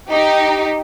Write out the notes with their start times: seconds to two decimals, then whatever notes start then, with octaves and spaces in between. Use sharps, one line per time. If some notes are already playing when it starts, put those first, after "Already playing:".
0.10 D#4 G4